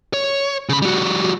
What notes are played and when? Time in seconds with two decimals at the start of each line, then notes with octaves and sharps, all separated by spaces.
0.14 C#5
0.69 C#3 B5
0.82 G3 F#4